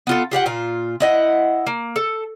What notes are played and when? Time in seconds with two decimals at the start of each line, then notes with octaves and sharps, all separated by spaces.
0.07 B3 F4 A4
0.31 F4 G4 F5 F#5
0.46 A#2 F4
1.00 E4 D#5 F#5
1.67 A#3
1.96 A4